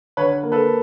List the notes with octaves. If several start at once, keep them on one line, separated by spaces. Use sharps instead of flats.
D3 B4 C#5
A#3
A4 B4